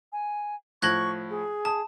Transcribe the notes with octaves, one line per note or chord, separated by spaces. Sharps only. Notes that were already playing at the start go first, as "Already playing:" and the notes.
G#5
A2 F3 C#6 F#6 G#6 A#6 F#7
G#4
A5 D#6